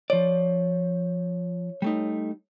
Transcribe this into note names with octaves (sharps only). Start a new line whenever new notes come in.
F3 C#5 D5
G3 A3 D#4